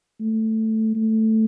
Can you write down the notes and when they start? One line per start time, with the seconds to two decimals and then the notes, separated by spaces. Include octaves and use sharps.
0.20 A3
0.95 A3